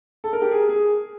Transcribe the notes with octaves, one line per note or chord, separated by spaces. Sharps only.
A4
A#4
G4
G#4
G#4